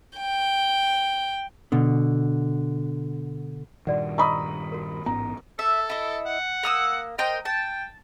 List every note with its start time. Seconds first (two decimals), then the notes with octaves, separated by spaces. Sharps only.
0.19 G5
1.72 B2 D3
3.87 G2 A#2 D#3 F#4 D5 F#5
4.18 D#5 A#5 B5 C#6 D#6 E6
4.72 F#4 A#4
5.06 A1 G#2 B3 C#4 A#5
5.59 A4 E5
5.90 E4 D#5
6.26 F#5
6.63 A#3 D#6 E6
7.18 A#4 C5 D#5 G5
7.45 G5 A5